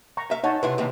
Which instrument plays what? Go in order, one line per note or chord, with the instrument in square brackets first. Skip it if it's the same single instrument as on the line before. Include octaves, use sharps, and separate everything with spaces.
[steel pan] A#5 C#6
[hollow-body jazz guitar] E5 F5
[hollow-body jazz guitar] D#4 [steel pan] C#5 F#5 A5
[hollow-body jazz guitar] C3 E4 F4 [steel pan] B4
[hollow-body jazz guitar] D#2 A2 C3